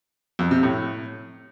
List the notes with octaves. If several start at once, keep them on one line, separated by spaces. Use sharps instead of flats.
F2
C3
A2